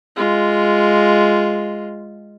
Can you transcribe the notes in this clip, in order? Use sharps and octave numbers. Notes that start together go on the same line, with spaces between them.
G#3 F4